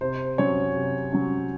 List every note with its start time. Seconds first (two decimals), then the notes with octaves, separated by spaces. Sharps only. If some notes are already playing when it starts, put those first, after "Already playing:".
0.01 C3 C5
0.38 F#3 C#4 C#5
0.76 C3
1.13 F#3 C#4